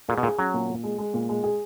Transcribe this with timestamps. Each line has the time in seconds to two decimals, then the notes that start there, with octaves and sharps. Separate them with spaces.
0.08 A#2 G#4
0.18 B2
0.23 A#2 G#4
0.39 F#3 C#4
0.54 A#2
0.69 A#2
0.84 G#3
0.98 G#3
1.14 A#2
1.29 G#3
1.44 G#4